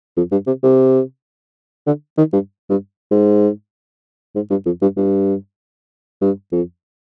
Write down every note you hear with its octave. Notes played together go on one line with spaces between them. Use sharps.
F2
G2
C3
C3
D3
D#3
G2
G2
G#2
G#2
G2
F2
G2
G2
G2
F2